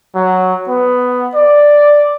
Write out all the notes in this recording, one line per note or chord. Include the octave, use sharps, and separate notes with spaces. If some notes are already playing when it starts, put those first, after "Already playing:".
F#3
B3
D5